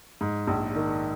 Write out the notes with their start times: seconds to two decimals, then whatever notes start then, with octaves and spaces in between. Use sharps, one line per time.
0.21 G#2
0.47 A#1
0.76 D#3